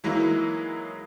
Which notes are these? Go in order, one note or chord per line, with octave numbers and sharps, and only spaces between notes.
E3 F#3 G#3 A#3 D#4 E4